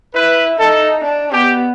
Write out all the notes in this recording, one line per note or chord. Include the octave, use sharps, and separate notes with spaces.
E4 B4
D#4 A4
D4
B3 G4